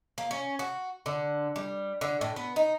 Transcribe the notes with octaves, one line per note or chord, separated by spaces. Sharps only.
A#3
C#4
F#4
D3
G3
D3
A2
B3
D#4